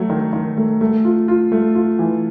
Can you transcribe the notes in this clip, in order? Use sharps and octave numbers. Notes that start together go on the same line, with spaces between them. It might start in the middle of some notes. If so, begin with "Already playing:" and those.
Already playing: F#3 A3
D#3
D#3
A3
A3
F4
F4
A3
F4
E3